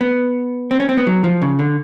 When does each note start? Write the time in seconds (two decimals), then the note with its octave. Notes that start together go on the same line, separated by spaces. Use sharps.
0.01 B3
0.71 C4
0.80 C#4
0.89 C4
0.97 B3
1.07 F#3
1.24 F3
1.42 C#3
1.59 D3